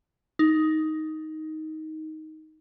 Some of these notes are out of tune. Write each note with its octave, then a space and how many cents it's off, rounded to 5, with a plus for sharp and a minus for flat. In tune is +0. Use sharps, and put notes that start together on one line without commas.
D#4 +10